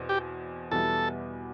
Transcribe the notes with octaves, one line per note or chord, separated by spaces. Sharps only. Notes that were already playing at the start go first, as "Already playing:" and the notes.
Already playing: E2 B2 C4
G4
E2 B2 G3 B3 E4 A4